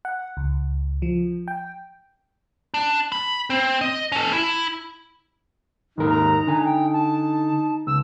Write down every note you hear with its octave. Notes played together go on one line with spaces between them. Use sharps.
F#5
C#2
F3
G5
D4
B5
C4
D#5
C#4 A4
E4
D#2 G#2 D#4 A#4
A#5
D3 G#5
G5
A5
C#2 E6